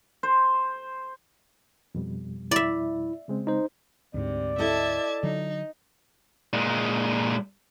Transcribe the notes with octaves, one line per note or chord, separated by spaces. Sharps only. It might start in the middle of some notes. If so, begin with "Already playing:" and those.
C5
F2 B2 G3
E4 D5 E5
C#3 G#3 C4
D#4 C5
D2 G#2 C3 D5
E4 A4 D#5 E5 A5 G#6
D3 F#3 D#4
A#2 G#3